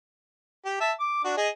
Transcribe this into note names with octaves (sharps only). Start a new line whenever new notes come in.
G4
E5 A5
D6
D4 F#4
G#4 D#5